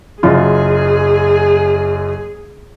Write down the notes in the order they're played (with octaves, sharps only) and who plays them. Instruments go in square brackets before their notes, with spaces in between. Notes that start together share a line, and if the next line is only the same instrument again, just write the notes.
[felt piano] F#1 F#2 F4 [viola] G#4